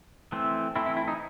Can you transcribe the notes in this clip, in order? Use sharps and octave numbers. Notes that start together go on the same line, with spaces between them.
E3 A3 C4
E3 A3 C4 E4
E4
E4
D#4